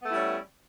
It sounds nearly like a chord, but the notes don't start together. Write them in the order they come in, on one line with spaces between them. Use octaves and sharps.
B3 A3 E4 G3 C#4